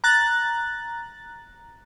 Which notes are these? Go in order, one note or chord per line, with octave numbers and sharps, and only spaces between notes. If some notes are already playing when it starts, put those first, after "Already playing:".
A#5 F#6 A6